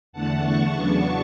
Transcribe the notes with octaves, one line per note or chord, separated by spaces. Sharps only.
E2 D3 A3 F#5 A5
A5 C#6
E2 C#3 F#3 B3 D4 A5 C#6